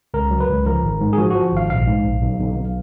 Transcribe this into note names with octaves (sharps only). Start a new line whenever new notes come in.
C#2 A#4
F#3
B4
C#2
F3 A#4
G#1
G#2
G#4
F3 F#4
F3 F#4
G#1 F5
A#1 F5
G#2
A#1
B1
B1
B1